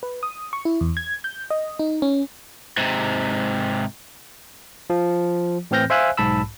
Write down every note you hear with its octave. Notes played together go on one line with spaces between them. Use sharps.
B4
D#6
C#6
E4
E2
G#6
G6
D#5
D#4
C#4
G#2 C3
F3
A2 E3 C4 F6 G6 A#6
C5 E5 F5 G#5 E6 F#6
B1 G#2 A5 B5 E6